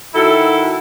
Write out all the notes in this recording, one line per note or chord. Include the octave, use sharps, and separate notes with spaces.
D#3 E4 F#4 A4